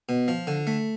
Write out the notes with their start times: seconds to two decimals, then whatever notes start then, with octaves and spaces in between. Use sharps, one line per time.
0.09 B2
0.28 F3
0.47 D3
0.67 A3